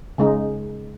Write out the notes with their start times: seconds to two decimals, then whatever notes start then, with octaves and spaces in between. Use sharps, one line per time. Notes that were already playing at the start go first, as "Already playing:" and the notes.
0.18 C#3 G#3 D#4